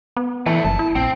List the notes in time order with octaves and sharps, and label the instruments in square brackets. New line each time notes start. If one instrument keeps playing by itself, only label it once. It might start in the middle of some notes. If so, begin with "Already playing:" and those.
[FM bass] B3
[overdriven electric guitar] E2 A3 [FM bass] E3
[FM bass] F#1 [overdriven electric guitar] A5
[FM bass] E4
[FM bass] A#1 [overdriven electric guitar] C4